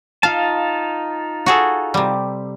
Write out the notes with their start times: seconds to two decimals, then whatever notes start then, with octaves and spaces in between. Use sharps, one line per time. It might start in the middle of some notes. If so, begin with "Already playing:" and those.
0.23 D#4 F4 F5 A5
1.46 F#4 G#4 A4
1.94 C3 G3